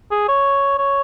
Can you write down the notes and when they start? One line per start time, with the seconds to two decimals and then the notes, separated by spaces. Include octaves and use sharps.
0.11 G#4
0.28 C#5
0.78 C#5